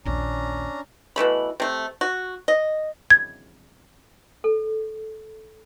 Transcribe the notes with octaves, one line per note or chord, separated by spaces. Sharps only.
A#1 D#2 C#4 D4 A#5
B2 E3 A3 B5
C3 A3
F#4
D#5
G#6
A4